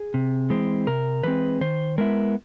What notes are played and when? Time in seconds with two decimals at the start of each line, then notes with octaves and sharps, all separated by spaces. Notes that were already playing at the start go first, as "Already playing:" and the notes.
Already playing: G#4
0.14 C3
0.50 E3 G#3 C4
0.87 C3 A#4
1.23 E3 G#3 C4 B4
1.61 D#3 C5
1.98 G#3 B3 E4 A#4